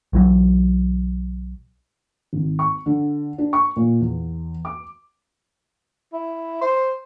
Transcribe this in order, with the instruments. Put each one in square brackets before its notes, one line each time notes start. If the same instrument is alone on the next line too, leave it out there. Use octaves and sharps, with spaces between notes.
[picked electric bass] B1 E3 F#3
[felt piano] G#1
C#6
D3
D4
C#6
A#2
E2
D6
[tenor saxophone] E4
C5